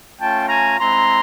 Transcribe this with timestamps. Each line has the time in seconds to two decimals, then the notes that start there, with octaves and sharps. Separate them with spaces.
0.20 A3 C#4 F4 G5 A5
0.49 G#5 A#5
0.78 G#3 C4 E4 A#5 C6